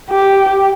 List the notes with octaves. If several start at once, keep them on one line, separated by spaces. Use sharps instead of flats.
G4